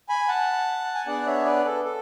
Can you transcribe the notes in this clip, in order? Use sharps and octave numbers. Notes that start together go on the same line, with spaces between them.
G#5 B5
F#5 A5
G#5
B3 D4 G#4 D5 F#5
C#5 E5
B4 D5
A4
A4